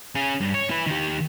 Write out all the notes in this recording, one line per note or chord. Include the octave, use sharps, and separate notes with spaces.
C#4 G#4
G2
C#5
E4 B4
D#3 G4